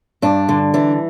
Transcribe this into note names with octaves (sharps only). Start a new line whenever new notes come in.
G2 D4
D3
E3 D4